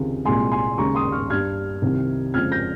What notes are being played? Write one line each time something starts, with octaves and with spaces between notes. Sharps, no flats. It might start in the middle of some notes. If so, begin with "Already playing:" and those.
Already playing: C#2 C3 D#3 G#3
C2 A#2 G#3 G#5 C6
G#5 C6
D#2 C#3 G#3 A#5 C#6
C6 D#6
C#6 F6
G2 G3 F6 G#6
C2 C3 D#3
F2 C#3 F3 G#3 F6 G#6
G6 A#6